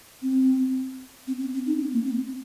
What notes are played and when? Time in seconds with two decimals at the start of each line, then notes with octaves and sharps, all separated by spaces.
0.22 C4
1.27 C4
1.40 C4
1.54 C4
1.66 D#4
1.80 C4
1.93 A#3
2.05 C4